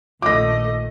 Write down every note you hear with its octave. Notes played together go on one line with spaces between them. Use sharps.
A#1 D#3 A3 F4 D#5 D6 A#6